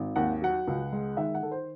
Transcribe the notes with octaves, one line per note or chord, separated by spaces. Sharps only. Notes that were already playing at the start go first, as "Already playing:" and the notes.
Already playing: G#1
D#2 F#5
F#3 F#5
C#2
G#3
D#3 E5
F#5
D#3 A4
C5